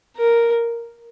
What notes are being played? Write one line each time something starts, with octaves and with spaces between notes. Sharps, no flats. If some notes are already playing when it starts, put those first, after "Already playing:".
A#4